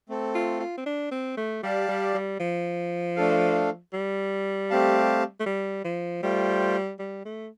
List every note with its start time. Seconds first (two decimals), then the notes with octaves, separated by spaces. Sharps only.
0.09 A3 C4 A4
0.35 F4
0.60 F4
0.77 C4
0.86 D4
1.11 C4
1.37 A3
1.63 G3 G4 D5 F5 A5
1.88 G3
2.14 G3
2.40 F3
3.16 A3 D4 A4 F5
3.93 G3
4.70 A3 C4 G4 F5 A5
5.40 A3
5.46 G3
5.84 F3
6.23 G3 A3 F4 C5 G5
6.99 G3
7.25 A3